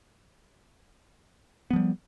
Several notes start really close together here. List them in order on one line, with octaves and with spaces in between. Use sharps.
B3 F3 G3